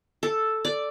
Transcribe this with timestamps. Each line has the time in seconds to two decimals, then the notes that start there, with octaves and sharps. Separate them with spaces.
0.23 A4
0.65 D5